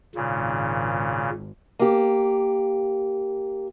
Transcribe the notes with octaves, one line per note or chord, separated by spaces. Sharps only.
G#1 A#2 C#3
A#3 G4